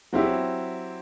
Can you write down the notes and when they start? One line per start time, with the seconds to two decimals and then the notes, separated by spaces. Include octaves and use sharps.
0.13 F#3 C4 E4 G4